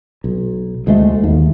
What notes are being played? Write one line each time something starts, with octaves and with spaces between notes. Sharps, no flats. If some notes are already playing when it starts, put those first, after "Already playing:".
B1
D2 G#3 A3
D#2